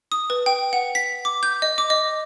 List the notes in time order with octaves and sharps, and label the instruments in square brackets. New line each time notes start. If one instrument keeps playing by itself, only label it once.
[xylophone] D#6
B4
G5
F#5
B6
D6
G6
D#5
D6
D#5